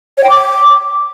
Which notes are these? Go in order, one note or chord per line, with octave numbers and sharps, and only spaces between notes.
C#5
G5
D6